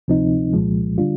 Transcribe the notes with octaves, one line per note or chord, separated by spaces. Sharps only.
D2 C3 F3 C4 D#4
C2 A#2 F3 G#3
D3 G3 D4 F4